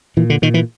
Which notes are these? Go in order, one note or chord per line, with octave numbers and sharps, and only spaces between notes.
A#2 E3
D3
A#2 D#3
E3